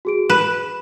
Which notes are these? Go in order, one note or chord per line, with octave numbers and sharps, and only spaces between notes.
F#4 G#4 D7
B4 E7